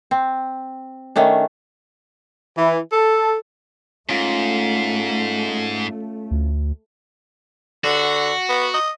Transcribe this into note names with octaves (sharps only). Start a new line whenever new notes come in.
C4
D#3 A3 C#4 D4
E3
A4
G#2 A3 C#4 F4
D2
D3 F#4
B3
D#5